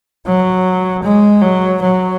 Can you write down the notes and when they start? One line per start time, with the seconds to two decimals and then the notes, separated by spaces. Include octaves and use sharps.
0.26 F#3
1.03 G#3
1.42 F#3
1.81 F#3